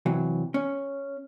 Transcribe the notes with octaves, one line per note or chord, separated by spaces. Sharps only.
C3 E3 F#3
C#4